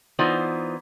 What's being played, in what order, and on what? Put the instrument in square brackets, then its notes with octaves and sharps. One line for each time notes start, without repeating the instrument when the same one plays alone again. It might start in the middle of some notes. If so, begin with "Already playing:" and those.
[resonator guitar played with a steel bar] E3 B3 D#4 F4 C5 D5